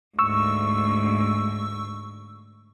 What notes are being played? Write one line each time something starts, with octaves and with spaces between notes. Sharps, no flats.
D2 G#2 C#6 E6